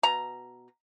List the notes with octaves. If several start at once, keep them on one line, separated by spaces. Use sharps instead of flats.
B2 A#5